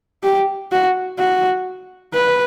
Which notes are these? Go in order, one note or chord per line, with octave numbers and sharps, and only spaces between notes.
G4
F#4
F#4
B4